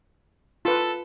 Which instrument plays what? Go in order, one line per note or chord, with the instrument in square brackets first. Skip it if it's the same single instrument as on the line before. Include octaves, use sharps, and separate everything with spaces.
[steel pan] F4 B4 [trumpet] A4